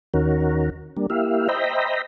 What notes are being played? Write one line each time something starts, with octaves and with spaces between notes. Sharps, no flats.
D#2 D#3 C#4 F#4 A#4
G3 A#3 D4
A#3 E4 G4 E5 F5
C5 D#5 E5 G5 A#5 B5